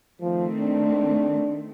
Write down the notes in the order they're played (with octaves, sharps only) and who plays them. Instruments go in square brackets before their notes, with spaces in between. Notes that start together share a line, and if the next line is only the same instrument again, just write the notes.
[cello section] D#3 A3 C4 [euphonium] F3
[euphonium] D4